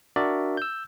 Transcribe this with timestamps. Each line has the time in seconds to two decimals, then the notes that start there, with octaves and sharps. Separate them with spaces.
0.16 D4 F#4 A#4 D5 E5
0.57 E6 G6